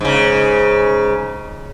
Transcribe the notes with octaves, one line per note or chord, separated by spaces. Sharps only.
G#2 C#3